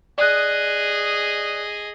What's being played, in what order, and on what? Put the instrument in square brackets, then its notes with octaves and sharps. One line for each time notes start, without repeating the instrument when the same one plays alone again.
[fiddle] G#4 D#5 [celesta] D5 F#6